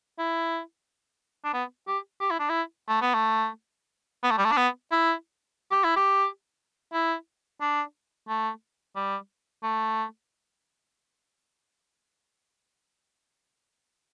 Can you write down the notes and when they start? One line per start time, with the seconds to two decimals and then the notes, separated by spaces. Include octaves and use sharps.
0.19 E4
1.45 D4
1.54 B3
1.88 G4
2.21 G4
2.31 E4
2.40 D4
2.50 E4
2.89 A3
3.01 B3
3.14 A3
4.24 B3
4.31 A3
4.38 G3
4.45 A3
4.52 D4
4.57 B3
4.92 E4
5.72 G4
5.84 E4
5.97 G4
6.94 E4
7.61 D4
8.29 A3
8.96 G3
9.64 A3